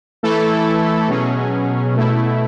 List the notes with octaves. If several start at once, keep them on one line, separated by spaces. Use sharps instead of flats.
E3 A3 E4 A4
B2 F#3 C#4 G#4
B2 A3 E4